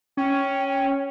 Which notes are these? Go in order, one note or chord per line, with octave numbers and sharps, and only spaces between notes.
C#4 G5